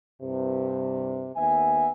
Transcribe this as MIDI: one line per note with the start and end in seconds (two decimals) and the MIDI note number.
0.22 1.30 36
0.22 1.30 43
0.22 1.30 48
1.36 1.90 39
1.36 1.90 59
1.36 1.90 76
1.36 1.90 80